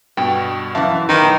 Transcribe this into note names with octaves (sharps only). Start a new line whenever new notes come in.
G2 B2 G5
F#2 E3 E5 F5 A5
D#3 B4 D#7
B1